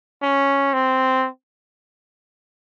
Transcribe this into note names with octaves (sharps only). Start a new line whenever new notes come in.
C#4
C4